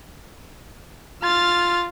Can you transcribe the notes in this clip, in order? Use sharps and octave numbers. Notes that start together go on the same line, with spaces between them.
F4 F6 A6